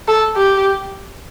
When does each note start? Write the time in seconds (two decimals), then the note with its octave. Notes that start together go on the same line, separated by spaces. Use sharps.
0.08 A4
0.36 G4